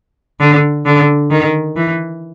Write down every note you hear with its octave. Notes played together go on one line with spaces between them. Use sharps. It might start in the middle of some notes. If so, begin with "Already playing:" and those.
D3
D3
D#3
E3